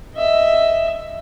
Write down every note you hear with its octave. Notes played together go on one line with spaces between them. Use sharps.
D#5 E5